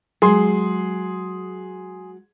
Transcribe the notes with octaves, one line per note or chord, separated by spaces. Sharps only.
F#3 G#3 G#4 C6